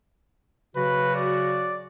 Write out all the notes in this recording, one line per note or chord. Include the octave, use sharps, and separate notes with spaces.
C#3 F#3 F#4 B4
D5